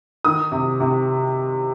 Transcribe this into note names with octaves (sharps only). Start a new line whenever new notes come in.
D#3 D#6
C3
C3